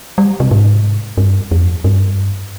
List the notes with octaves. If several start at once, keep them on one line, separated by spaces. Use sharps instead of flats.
G3
C3
G#2
G2
F2
G2